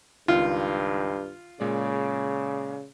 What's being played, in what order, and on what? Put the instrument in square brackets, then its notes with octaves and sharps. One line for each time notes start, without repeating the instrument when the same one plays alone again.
[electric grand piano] C#2 D#3 [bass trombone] G2 [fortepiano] F4
[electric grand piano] A#2 G#3 D5 [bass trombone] C#3